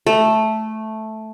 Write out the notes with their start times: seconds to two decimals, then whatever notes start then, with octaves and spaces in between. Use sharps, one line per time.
0.06 A3